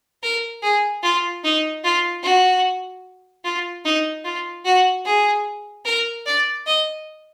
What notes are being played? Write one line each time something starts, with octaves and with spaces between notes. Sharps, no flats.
A#4
G#4
F4
D#4
F4
F#4
F4
D#4
F4
F#4
G#4
A#4
D5
D#5